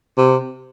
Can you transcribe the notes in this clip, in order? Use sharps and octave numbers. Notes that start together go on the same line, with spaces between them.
C3